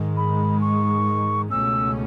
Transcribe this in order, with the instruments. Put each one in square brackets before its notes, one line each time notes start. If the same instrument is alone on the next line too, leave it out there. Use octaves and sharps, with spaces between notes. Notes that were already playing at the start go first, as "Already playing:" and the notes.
Already playing: [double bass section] G#2 D#3 G#3
[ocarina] B5
C#6
[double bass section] C#2 B2 A3 C#4 [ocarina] E6